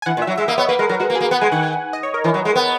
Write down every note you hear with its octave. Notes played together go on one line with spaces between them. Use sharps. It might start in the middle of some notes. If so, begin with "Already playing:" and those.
G#5
E3 F#5
A#2
E5
F#3
G#3 E5
A#3 D#5
B3 C#5
A#3 B4
G#3 A#4
F#3 A#4
G#3 F#4
A#3
G#4
A#3
B3 F#5
G#3 G#5
D#3 F#5
D#5
C#5
A#4
E3
F#3
G#3
B3